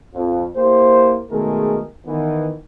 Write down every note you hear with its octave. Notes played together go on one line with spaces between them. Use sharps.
F2
A#3 E4 G4 C5
B2 D#3 G#3 A3 G#4 A#4
D#3 E3 B3